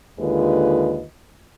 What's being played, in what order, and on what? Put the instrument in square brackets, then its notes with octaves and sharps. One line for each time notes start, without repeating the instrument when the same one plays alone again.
[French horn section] D#2 D3 G#3 F4 B4 D#5